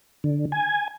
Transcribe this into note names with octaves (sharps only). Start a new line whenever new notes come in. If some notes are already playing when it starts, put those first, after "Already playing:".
D3
G#5